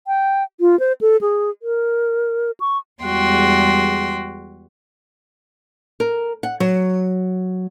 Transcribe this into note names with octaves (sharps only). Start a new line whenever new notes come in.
G5
F4
C5
A4
G#4
A#4
C#6
E2 G3 G#3 F#4 G5 C6
A#4
F#5
F#3